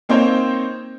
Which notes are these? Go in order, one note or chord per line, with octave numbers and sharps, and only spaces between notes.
A#3 C4 D#4 C5 C#5